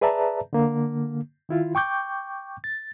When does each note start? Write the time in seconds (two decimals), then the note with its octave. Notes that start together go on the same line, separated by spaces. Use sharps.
0.01 G#4 B4 D5 E5 A5 A#5
0.53 D3 A#3
1.49 D#3 E4 F4
1.75 G5 C#6 D6 G6
2.64 A6